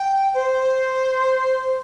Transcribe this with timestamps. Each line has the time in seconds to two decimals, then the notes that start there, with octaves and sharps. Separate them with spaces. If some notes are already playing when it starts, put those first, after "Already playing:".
Already playing: G5
0.34 C5